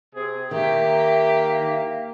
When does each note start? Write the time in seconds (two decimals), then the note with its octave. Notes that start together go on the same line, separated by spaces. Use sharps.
0.14 C3 C4 G#4
0.51 D#3 A#3 G4 E5